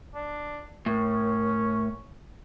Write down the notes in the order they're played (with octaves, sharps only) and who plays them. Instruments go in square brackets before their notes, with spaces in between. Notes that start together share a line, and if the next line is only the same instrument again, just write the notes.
[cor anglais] D4
[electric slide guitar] A2 [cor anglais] C#4 [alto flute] A#4